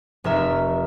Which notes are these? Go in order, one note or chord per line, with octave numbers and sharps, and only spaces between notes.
F1 A#4 E5